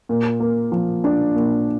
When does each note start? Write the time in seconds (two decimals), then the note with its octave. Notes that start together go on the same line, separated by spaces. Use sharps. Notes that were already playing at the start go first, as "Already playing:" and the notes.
0.09 A#2
0.40 A#3
0.72 F3
1.04 D4
1.35 A#2